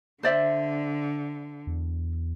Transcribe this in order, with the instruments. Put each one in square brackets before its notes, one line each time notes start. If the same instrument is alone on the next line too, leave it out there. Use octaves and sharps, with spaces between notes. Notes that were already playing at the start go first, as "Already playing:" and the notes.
[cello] D3 [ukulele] C5 D5 E5
[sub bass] E2